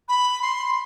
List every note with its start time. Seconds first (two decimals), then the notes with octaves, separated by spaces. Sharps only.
0.09 B5
0.42 C6